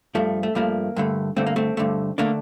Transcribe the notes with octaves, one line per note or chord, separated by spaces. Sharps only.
G2 F3 A3
A3
G2 F3 A3 A#3
G2 D3 A3
G2 D3 A3 C4
A#3
A3 C4
G2 D3 A3
D3 A3 A#3 D4